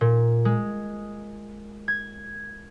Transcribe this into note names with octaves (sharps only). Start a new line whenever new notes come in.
A#2
G#3
G#6